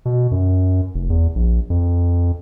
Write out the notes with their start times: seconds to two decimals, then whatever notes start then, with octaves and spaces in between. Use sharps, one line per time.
0.05 B2
0.31 F#2
0.94 F1
1.10 E2
1.35 A#1
1.70 F2